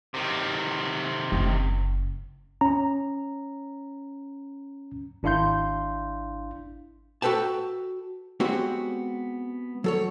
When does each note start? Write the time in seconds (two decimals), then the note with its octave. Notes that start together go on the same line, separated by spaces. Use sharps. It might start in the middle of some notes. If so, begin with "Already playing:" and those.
0.14 C3 D#3
1.32 F#1
2.61 C#4 A#5
5.23 G#1 D4 E4 F5 C6 G6
7.22 F#4 A4 B4 G5 A5
8.40 G#3 B3 C4 F#4 G4 C#5
9.84 F#3 A4 C#5